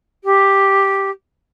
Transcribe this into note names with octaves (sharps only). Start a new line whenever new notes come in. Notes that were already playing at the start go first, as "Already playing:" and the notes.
G4